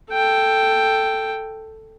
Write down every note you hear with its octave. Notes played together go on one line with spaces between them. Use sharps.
A4 G5